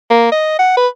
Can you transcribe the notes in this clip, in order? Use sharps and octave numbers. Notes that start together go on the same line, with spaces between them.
A#3
D#5
F#5
B4